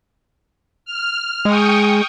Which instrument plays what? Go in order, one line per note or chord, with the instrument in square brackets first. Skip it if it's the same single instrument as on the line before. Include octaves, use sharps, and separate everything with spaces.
[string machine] F6
[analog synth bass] G#3 [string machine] G5 C#6 D#6